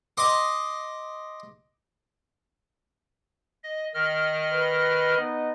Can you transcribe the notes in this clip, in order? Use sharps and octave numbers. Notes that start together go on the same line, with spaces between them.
D#5 C6 D6
D#5
D#3 D#5 F6
B4
B3 D#4 D#5